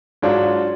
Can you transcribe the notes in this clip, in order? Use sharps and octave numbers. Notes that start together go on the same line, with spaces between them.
G#2 F#3 D4 F4